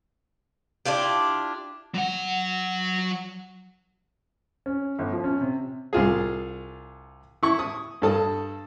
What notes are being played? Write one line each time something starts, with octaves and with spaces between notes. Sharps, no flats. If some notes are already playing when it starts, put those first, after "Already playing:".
D4 E4 F4 G4
F#3 F#5
C#4
G1
F3
C#4
C3
C2 F4 G#4
E4 C#6
D#6
G2 A4 D#6